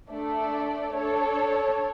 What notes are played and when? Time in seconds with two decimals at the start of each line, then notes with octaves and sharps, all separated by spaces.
0.10 A3 D4 A4 D5
0.96 D4 A4 C#5